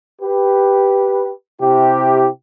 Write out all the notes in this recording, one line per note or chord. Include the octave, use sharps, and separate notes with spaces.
G4 B4
C3 E4 G4